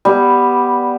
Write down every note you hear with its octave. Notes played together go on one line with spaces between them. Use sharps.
G3 B3